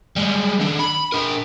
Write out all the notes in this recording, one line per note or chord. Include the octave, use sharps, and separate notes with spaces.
G3 G#3
D#3 D4
B5
D4 A#4